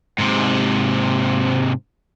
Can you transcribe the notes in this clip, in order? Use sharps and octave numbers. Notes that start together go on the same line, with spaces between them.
G#2 C3